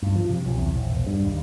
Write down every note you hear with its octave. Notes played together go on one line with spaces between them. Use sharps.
G2
F3
C3
B1
E2
A#1
E1
G2
D#2